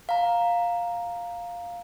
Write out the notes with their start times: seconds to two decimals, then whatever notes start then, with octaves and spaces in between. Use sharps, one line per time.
0.09 F5 A#5